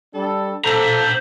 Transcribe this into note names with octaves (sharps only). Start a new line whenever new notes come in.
G3 D4 A4
A4 C5 A#5